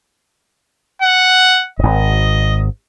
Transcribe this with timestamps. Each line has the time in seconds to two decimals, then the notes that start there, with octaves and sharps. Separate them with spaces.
1.02 F#5
1.79 D#1 G#1 D#5